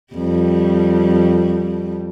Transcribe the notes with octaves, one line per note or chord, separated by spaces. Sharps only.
F2 G3